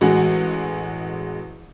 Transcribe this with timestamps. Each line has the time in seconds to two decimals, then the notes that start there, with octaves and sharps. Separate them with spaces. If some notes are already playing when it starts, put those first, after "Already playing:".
0.01 A1 G#3 F#4 G#4